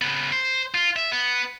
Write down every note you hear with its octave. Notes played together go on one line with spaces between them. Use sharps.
C#3 B3
C5
F4
E5
B3